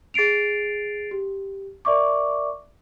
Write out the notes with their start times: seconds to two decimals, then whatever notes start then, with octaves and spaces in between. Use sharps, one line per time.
0.14 G#4 A6 C7 D7 F7
1.11 G4
1.85 A#4 D5 E5 C#6 D6